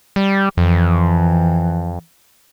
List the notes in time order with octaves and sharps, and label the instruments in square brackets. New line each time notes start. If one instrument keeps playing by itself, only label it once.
[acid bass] G3
[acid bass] F2 [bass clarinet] E3